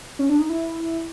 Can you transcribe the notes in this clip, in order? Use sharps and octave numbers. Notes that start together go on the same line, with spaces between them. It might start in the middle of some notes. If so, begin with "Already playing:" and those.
C#4
D4
D#4
E4